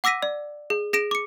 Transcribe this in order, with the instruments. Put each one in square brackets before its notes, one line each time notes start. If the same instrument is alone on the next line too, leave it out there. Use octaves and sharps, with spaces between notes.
[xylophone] F#5 D6 E6 A#6 B6 D#7
D5
G#4
G#4 A#6 D7 E7
D6 C#7